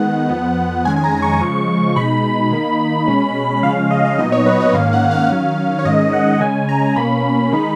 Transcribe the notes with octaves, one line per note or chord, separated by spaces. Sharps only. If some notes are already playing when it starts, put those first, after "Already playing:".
Already playing: D#3 G#3 B3 D#4 F#5
F2 F3 B3
F2 D#3 G#3 C#4 G#5
G#5
A#5
C#6
C#3 F3 G#3
B2 G#3 D#4 B5
D#3 A#3 D#4
B2 G#3 C#4
C#3 F3 G#3 C#4 F5
D#5
F5
A#2 F#3 B3 D#4 D#5
C#5
B4
D#5
G#2 D#3 A#3 C#4 F5
F#5
F5
D#3 F#3 C#4 F5
C#5
G#2 D#3 G#3 C#4 D#5
F#5
C#3 G#3 C#4 G#5
A#5
B2 A#3 C#4 B5
D#3 G#3 D#4